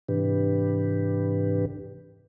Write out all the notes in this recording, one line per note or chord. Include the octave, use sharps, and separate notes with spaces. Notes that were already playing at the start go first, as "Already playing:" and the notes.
G#2 C3 E3 D4 G4 B4